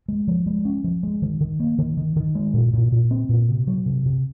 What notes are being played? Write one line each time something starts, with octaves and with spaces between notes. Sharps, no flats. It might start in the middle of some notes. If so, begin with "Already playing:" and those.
G#3
F3
G#3
C#4
F3
G#3
D#3
D#3
A#3
D#3
D#3
D#3
G#3
A#2
A#2
A#2
C4
A#2
C3
F#3
C3
C3